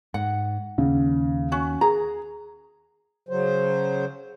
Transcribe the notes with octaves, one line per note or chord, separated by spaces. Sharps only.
G#2 F#5
D#2 C#3
C#4 F#4
G#4 A#5
C#3 F#3 C5